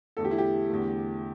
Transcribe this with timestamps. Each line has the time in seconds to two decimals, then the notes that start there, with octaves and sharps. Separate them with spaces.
0.17 E2 D3 A3 A4
0.25 G4
0.31 E4
0.38 G4
0.69 E2 D3 A3